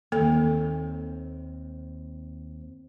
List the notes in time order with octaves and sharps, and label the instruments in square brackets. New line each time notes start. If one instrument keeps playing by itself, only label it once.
[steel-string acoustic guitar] D#2 C4 [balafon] A#3 A4